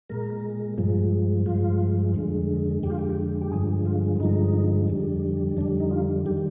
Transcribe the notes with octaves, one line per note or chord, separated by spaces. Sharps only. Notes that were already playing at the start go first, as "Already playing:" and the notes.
A#2 G#3 A#4
G2 F3 G#3
G2 F3 G#3 F4
F2 D3 G#3
F2 D3 G#3 G4
F4
G4
G4
G2 D3 F3 G#3 G#4
F4
G2 D3 F3 G#3 D#4
F2 D3 G3
F2 D3 G3 D4
D#4
F4
D#3 G3 G4